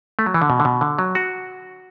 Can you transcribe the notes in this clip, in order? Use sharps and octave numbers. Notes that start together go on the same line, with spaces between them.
A3
F#3
E3
D3
B2
D3
B2
D3
F#3
F#4